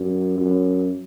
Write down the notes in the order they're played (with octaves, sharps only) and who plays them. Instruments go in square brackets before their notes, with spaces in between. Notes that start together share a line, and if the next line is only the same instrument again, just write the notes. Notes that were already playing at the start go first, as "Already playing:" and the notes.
Already playing: [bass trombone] F#2
F#2